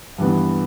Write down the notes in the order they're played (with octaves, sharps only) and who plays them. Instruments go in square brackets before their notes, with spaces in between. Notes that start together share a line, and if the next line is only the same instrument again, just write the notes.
[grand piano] G2 E3 B3